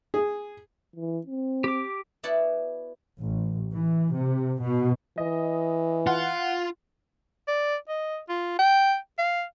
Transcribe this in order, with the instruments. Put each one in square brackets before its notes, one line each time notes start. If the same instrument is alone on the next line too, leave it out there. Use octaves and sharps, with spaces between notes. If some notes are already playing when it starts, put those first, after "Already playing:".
[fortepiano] G#4
[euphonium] E3
C4
[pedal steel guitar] G4 D6
[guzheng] B3 E4 F#4 D5 F#5 A5
[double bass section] A1
E3
C3
B2
[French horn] E3 [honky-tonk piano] D#5
[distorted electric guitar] F4 [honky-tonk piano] F#5
[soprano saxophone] D5
D#5
F4
G5
F5